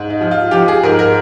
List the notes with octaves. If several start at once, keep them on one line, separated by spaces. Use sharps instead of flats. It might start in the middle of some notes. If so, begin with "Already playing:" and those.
Already playing: G#2
D#4
F3
F4
F3 G4
G#4
G#2 A#4
A#4